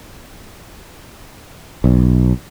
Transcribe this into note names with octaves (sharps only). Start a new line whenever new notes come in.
B1